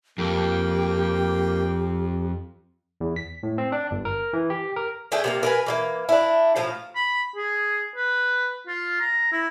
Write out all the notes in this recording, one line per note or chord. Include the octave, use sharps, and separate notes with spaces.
F2 A#3 G4 G5
E2
B6
A2
C4
D4
G1
A#4
E3
G4
A#4
D3 A3 G#4 G5
C3 A#3 F5
A#4 B4 G#5
E3 G#3 A#3
D4 E4
A2 F3 F5 A#5
B5
G#4
B4
F4
A#5
E4